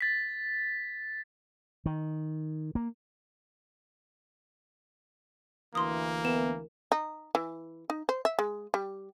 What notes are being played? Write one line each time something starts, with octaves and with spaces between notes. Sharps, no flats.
A6 B6
D#3
A#3
D2 E3 A#3 C6 D#6
B3 A#4 E7
D#4
E3
D#4
C5
E5
G#3
G3